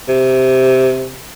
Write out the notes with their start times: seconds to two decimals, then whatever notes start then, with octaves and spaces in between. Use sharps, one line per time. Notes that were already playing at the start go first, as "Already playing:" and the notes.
0.09 C3